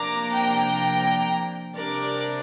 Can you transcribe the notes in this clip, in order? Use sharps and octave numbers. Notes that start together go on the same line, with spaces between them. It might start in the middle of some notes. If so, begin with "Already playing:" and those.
Already playing: C3 F3 A#3 D4 A#5 D6
G5 A#5
C3 G3 D4 A#4 D5